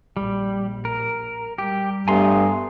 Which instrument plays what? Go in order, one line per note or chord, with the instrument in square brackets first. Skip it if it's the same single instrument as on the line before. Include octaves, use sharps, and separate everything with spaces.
[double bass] A#1 [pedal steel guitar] G3
[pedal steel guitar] A#4
[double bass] G3 [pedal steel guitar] G4
[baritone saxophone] G2 [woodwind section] A3 B3 [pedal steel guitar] G#5 A#5 C6